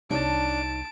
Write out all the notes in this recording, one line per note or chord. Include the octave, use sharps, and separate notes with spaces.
C2 D4 D#4 C#5 A5 D7